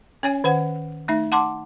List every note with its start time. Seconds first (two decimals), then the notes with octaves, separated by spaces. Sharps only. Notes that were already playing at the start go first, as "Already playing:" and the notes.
0.23 C#4 C#5 G#5
0.44 D#3 C5 F#5
1.08 A3 D#4 E5
1.32 F#5 A5 C6 D6